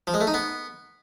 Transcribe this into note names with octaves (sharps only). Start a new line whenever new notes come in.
F3
G#3
A3
D#4
B3